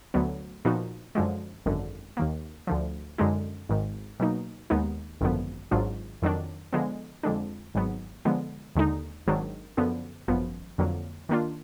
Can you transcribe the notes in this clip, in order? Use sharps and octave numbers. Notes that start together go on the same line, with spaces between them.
D2 D3 F#3 B3
A#2 F3 B3 D#4 F#4
F#2 D3 F3 G#3
G#1 F#2 D3
D#2 D#3 A#3
D2 D3 F3
F#2 D3 G#3 D#4
G#1 G#2 D#3
B2 F#3 A#3 D#4
D#2 D#3 G#3 B3 D#4
G#1 F#2 D3 F3 B3
G#1 G#2 F#3 D4 F4
F2 D#3 F#3 D4
D3 F3 G#3 B3
F2 D3 G#3 D4
G#1 G#2 F#3 B3
D3 F3 G#3 B3
D#2 D3 G#3 D#4
G#1 G#2 D#3 F#3 D4
F#2 D3 F3 B3
G#1 F#2 F3 B3
F2 D3 F#3 A#3
D#3 A#3 D4 F4